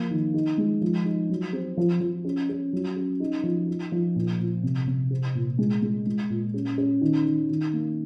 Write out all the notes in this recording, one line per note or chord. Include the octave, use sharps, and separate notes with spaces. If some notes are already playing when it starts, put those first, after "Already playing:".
Already playing: F3 A#3
D#3
D#4
G#3
F3
D#4
F#3
C4
F3
F3
C#4
C#4
F#3
C#4
D#4
F3
D#4
F3
A#2
A#2
C3
C3
C4
A#2
G#3
G#3
G#3
A#2
C#4
C#4
D#3
D#3
D#3
A#3